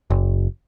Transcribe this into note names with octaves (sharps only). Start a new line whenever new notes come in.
F#1